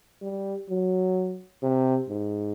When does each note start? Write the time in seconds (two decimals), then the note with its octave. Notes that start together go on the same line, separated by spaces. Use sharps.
0.22 G3
0.70 F#3
1.63 C3
2.09 G#2